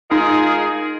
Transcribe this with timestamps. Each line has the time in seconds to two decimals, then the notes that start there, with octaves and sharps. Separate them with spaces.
0.11 D#3 G#3 D#4 F4 G#4